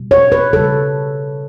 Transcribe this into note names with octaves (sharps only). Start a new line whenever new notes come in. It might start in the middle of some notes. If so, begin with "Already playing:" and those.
Already playing: B2 G3
C#5
B4
C#3 G3 A4